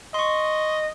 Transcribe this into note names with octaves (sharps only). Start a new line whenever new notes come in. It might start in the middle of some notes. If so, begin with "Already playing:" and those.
D#5 C6 C#6